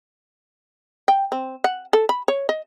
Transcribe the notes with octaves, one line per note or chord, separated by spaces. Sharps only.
G5
C4
F#5
A4
B5
C#5
D#5